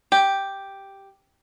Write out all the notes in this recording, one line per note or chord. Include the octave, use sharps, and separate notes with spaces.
G4